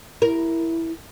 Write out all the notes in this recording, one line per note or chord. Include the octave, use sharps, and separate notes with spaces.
E4 A#4